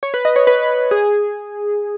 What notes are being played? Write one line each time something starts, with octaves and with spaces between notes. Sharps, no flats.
C#5
B4
D#5
C#5
B4
G#4